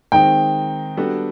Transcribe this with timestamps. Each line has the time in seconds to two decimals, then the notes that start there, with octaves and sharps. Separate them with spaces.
0.12 D#3 G#3 C4 D#4 G5
0.97 G3 B3 D4 F#4 A4